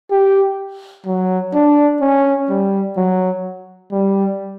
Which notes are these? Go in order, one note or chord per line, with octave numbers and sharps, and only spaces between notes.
G4
F#3
D4
C#4
G3
F#3
G3